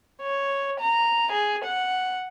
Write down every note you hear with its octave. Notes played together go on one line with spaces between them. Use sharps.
C#5
A#5
G#4
F#5